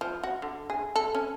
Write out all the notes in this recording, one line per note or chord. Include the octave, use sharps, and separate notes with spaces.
F3
F#4
D3
G#4
A4
C#4